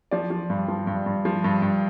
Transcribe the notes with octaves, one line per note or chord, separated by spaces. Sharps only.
F3 D5
F3
G2
F3
G2
G2
F3
G2
G2